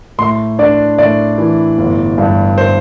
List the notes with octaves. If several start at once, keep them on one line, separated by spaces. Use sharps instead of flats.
A2 C6
D4 D5
A2 D5
E3
G1
G2
C5